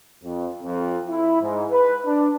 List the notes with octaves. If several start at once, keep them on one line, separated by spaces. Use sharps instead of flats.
F2
F2
E4
G#2
B4
D4